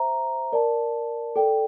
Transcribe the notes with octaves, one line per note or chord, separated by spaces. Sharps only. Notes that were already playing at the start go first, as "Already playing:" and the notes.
Already playing: C5 E5 A#5
A#4 D5 A5
A4 D5 G5